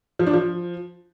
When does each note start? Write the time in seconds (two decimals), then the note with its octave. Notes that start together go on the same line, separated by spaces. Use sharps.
0.19 F3
0.26 D4
0.34 F3